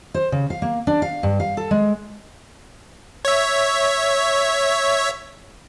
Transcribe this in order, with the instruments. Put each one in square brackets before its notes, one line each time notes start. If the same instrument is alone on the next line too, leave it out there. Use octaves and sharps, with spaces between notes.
[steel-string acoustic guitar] C5
C#3
F5
A#3
D4
F5
G2
F5
A4
G#3
[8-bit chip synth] C#5 E5